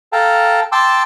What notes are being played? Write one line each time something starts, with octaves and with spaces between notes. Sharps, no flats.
A4 F5 G5 A5 A#5
G5 A5 C6 D6 E6